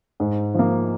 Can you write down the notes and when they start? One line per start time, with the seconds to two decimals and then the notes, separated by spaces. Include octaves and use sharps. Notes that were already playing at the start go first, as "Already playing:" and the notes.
0.20 G#2
0.54 F3 A#3